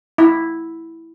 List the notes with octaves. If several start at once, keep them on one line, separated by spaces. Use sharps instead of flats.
E4